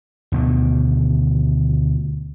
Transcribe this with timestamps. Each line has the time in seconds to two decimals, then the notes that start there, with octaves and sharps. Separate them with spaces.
0.32 D2 B2 D3 D#3